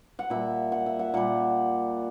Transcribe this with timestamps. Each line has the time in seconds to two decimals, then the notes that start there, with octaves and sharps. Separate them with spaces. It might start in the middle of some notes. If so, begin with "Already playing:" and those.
0.19 F#5
0.30 A#2 G3 E5
0.72 F#5
0.86 E5
0.99 F#5
1.14 A#2 G3 F#5